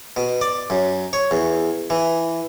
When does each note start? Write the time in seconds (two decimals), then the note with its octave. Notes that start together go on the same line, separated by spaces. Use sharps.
0.17 B2
0.41 D5
0.70 F#2
1.13 C#5
1.31 E2
1.90 E3